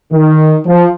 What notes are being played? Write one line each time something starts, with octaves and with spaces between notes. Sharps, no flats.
D#3
F3